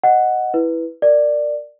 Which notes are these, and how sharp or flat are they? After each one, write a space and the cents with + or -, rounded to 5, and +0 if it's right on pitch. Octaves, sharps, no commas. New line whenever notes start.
D#5 +0 F#5 +0
E4 +0 B4 +0
A#4 +0 D5 +10